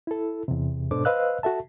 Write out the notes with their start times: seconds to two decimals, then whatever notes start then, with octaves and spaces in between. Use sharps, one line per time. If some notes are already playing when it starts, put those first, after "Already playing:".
0.07 E4 A4
0.48 E2 C3
0.91 G#2 B2 D4 A4 C5 D6
1.05 B4 C5 D#5 F5 E6 F#6
1.43 F#4 A4 E5 A5